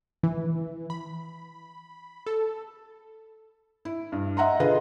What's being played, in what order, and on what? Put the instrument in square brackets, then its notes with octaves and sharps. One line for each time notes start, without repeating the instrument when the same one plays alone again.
[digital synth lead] E3
B5
A4
[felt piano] E4
G2
D#5 E5 F#5 A#5 C6
D3 F4 G#4 B4 D#5